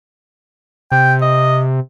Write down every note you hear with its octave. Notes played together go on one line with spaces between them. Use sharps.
C3 G5
D#5